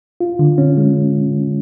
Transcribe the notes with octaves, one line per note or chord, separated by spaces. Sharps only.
F4
D3
C#4
G#3